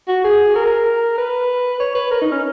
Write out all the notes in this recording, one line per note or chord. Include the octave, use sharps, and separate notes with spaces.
F#4
G#4
A#4
B4
C#5
B4
A#4
D#4
C#4